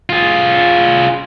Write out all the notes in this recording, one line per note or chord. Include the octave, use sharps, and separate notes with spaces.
F4 G#4